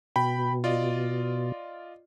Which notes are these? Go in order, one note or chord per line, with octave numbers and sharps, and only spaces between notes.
B2 G5 B5
F4 D5 D#5